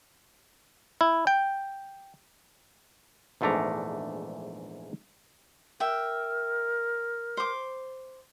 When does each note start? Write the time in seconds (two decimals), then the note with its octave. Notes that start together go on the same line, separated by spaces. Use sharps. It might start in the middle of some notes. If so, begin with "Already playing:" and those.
1.01 E4
1.27 G5
3.41 A#1 E2 G#2 A3 D4 A#5
5.80 A#4 E5 G5
7.37 C5 D6